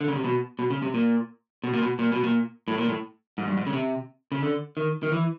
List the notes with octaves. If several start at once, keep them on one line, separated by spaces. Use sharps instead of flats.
D3
C#3
C3
B2
B2
C#3
C3
A#2
B2
A#2
B2
A#2
B2
A#2
A2
A#2
A2
G#2
G2
G#2
C#3
C3
C#3
D3
D#3
D#3
E3